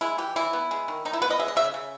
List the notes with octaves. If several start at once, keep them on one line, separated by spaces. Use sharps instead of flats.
G#3 E4
E3 G4
E3 E4
B3
G#3
D#3
D#3 D#4
E4
B3 B4
D#5
G#3 E5
D#5
C#3 E5
C#3